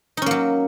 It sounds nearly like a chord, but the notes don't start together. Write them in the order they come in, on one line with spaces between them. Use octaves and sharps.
D#4 C#4 A#3 F#3